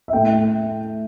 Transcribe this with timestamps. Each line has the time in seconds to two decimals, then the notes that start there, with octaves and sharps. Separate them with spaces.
0.08 E5
0.13 A2 A3 E4 G5